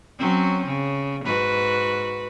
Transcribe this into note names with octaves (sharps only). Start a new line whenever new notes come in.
F#3 C4 C#4
C#3
G#2 F#4 B4